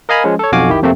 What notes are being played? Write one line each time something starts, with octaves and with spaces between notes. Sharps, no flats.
A#4 D#5 F5 G#5 A#5 B5
F3 G#3 C#4
A4 C#5
B1 F2 F#4 F5 G#5 D6
D#3 E4 G4
F2 C3 A3 A#3 C4